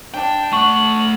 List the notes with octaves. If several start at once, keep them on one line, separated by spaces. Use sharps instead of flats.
D4 G5
A3 F#5 C#6 F#7